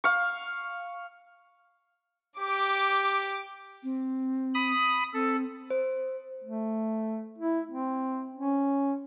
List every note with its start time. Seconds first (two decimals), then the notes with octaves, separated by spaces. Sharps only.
0.04 F5 C#6
2.40 G4 D6
3.83 C4
4.54 B5 D#6
5.13 C4 A4
5.70 C5
6.44 A3
7.39 E4
7.71 C4
8.34 C#4